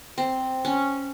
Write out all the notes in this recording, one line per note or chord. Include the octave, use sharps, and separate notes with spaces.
C4
C#4